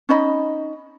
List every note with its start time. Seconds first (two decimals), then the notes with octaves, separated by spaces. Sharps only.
0.09 C#4 D#4 D#5 B5